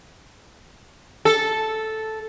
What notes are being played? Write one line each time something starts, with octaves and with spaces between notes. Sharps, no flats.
A4